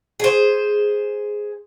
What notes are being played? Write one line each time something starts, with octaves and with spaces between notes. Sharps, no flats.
G#4 C5